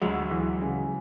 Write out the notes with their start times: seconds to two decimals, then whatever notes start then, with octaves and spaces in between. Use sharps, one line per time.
0.02 D2 F#3 G#3
0.31 E3
0.62 C#3